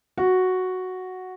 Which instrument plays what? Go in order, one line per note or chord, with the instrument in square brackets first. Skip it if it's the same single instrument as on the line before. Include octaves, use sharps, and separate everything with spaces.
[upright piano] F#4